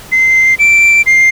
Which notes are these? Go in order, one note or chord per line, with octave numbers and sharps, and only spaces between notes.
C7
D7
C7